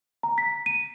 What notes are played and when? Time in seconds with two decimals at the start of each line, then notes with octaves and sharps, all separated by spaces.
0.23 A#5
0.38 B6
0.66 D#7